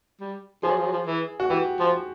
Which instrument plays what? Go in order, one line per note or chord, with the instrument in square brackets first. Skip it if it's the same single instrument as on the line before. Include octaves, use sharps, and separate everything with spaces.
[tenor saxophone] G3
[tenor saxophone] F3 [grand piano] G#4
[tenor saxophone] F#3
F3
F#3
F3
E3
[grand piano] F#4
[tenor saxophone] E3 [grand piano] G4
[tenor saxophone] F3